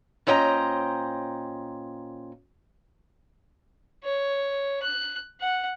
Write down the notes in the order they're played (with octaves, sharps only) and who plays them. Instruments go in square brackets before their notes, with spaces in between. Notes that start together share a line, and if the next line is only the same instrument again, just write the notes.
[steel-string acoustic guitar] A#2 C#4 C5 D#5 G5 A#5
[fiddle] C#5
F#6
F#5